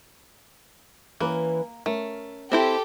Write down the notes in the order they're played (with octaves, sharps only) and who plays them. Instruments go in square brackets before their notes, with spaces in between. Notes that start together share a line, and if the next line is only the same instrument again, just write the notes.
[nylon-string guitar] E3 C#4 B4 [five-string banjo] A#3
[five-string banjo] A3 [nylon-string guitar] C#4 A#4
[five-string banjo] C4 E4 C5 [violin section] G4 A4